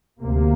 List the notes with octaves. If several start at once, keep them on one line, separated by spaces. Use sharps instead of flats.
D2 C3 A#3